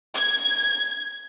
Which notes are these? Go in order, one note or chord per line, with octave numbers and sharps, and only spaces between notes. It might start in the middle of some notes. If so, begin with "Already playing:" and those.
G#6